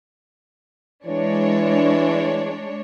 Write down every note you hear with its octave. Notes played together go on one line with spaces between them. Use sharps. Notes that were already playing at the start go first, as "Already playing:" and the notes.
E3 G#3 D4 C#5